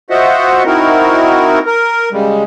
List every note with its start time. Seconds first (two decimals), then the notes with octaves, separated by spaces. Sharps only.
0.10 F4 F#4 C5 D#5 E5 F#5
0.66 C4 D#4 E4 F#4 A#4
1.66 A#4
2.12 C#3 G3 G#3